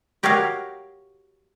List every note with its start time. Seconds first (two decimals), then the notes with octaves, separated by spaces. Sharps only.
0.23 F#4 G4 A#4 C#5 D#5 F5